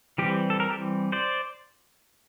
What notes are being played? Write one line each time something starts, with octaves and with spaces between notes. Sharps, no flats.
E3 G3 C4 G4
A4
A#4
G4 A4
C5 D5